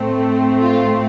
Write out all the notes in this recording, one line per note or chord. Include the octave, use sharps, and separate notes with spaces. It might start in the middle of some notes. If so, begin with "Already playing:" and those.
Already playing: A2 A3 C4
F4